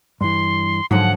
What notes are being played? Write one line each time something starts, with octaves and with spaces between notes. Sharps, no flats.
G2 E3 C6
G#2 D3 F3 F#3 F#5